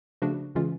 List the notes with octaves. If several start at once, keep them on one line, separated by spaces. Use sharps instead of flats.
C#3 F3 A3 D4 F#4
C#3 E3 G#3 C#4 F4